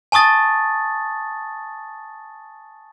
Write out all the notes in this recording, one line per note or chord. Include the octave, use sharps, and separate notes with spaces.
G#5 A5 C#6 D#6 A6